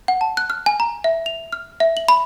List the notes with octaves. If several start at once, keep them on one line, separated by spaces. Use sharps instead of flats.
F#5
A5
F#6
F6
G#5
A#5
E5
F7
F6
E5
F#7
B5